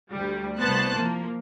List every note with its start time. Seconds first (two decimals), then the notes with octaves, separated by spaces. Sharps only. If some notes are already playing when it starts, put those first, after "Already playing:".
0.11 D2 G3
0.59 C2 B3 C5 A5 F#6
0.96 F3 A#3